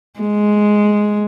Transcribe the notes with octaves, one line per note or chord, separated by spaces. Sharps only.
G#3